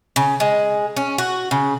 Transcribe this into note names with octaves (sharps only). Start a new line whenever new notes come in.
C#3
G#3
C#4
F#4
C#3